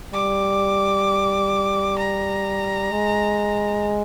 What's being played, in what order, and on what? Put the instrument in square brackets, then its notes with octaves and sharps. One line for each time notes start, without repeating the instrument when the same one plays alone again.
[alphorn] G3 [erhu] D6
[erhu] A#5
[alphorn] G#3